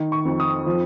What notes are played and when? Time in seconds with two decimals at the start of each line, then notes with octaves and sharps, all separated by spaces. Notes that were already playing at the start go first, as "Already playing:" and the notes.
Already playing: D#3
0.12 C#6
0.25 F2
0.40 D#6
0.66 F3